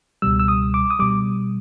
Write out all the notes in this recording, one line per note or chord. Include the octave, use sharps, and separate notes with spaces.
C#2 B2 G3 E6
E6
D#6
D6
D#6
B2 G3 D6